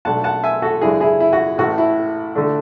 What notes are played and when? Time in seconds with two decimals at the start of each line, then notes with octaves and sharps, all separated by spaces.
0.05 B1 B2 A3 D4 F#5 A5
0.24 F#5 A5
0.44 E5 G#5
0.62 F#4 A4
0.81 F#2 C#3 E3 G#3 D4 E4 G#4
1.01 E4 G#4
1.20 E4
1.33 F#4
1.58 A1 A2 E3 A3 F#4
1.78 E4
2.35 D3 A3 D4